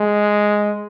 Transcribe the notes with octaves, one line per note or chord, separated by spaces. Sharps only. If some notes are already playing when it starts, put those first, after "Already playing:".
Already playing: G#3